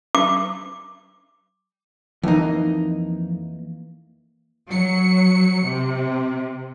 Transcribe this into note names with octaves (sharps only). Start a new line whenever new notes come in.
D6
F2 E3 A#3 D#4
F#3 C#7
C3